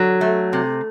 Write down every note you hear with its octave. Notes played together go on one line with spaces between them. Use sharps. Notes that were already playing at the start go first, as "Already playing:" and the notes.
Already playing: D3 F#3
A3
C3